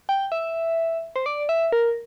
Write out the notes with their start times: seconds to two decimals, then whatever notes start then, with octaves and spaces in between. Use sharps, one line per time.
0.09 G5
0.32 E5
1.16 C5
1.26 D5
1.49 E5
1.72 A#4